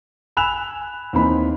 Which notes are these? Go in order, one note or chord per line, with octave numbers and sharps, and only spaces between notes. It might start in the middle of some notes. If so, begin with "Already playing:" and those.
G#5 B5 E6 F#6 E7 F7
D#2 E3 C4 D#4 B5